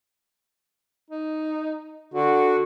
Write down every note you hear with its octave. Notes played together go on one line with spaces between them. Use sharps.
D#4
D3 F#4